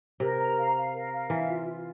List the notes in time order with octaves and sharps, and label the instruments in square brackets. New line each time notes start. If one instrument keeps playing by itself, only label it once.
[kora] C3 [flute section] A#4
[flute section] A#5
F5
F5
A#4
F5
[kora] E3 [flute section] E5
[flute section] F4
F4